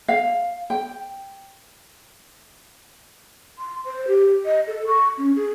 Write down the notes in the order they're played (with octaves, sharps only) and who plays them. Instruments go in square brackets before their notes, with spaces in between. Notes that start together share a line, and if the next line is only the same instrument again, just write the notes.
[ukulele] F5
G5
[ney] C6
C5
G4
D#5
A4
C#6
C#4
G#4